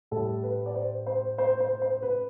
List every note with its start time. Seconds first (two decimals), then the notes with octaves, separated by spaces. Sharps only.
0.11 A2 G3 A4
0.43 B4
0.66 D5
0.75 C5
1.06 C5
1.38 C5
1.60 C5
1.82 C5
2.03 B4